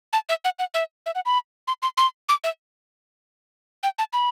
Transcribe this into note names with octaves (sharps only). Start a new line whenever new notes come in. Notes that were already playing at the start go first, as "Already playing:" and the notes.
A5
E5
F#5
F#5
E5
E5
F#5
B5
C6
C6
C6
D6
E5
G5
A5
B5